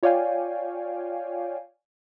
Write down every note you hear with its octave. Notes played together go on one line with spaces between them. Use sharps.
F4 C#5 D5 F5 G5 G#5